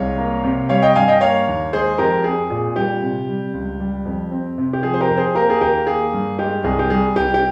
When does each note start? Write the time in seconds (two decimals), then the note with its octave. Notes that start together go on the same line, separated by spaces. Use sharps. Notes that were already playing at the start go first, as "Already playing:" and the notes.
Already playing: C2 G#3 C#5 F5
0.18 A#3
0.44 C3
0.69 G3 C#5 F5
0.82 D#5 G5
0.95 G2 F5 G#5
1.08 D#5 G5
1.21 A#3 C#5 F5
1.48 D#2
1.73 G#3 G#4 C5
1.98 F2 G4 A#4
2.24 C4 G#4
2.50 A#2 G#4
2.76 G3 G4
3.02 C3
3.28 G3
3.54 C#2
3.80 G3
4.05 F2
4.31 C4
4.58 C3
4.73 G4
4.83 F3 G#4
4.94 C5
5.01 G4 A#4
5.09 F2
5.17 G#4 C5
5.35 A#3 G4 A#4
5.50 G#4
5.61 D#2 G4 A#4
5.86 A#3 G#4
6.13 G2
6.38 G#3 G4
6.64 C2 G#4
6.79 G4
6.90 G3 G#4
7.16 C2 G4
7.34 G4